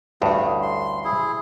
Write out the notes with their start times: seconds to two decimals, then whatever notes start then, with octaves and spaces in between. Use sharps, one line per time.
0.22 A1 D2 G2 A3 D4 G#4
0.62 C6
1.04 E4 G#4